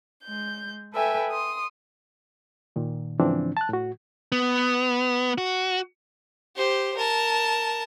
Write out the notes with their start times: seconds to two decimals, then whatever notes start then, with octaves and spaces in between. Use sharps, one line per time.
0.24 G#3 G6
0.93 A4 B4 E5 G5 G#5
1.31 C6 D#6
2.76 A#2 D#3
3.20 G#2 C#3 E3 F3 C4 D4
3.57 A5 F#6
3.69 A2 F#4
4.32 B3
5.38 F#4
6.56 G4 C5
6.96 A#4 A5